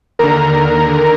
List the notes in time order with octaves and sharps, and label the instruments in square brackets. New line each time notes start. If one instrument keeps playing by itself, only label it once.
[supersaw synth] D#2 D3 A#4 A#5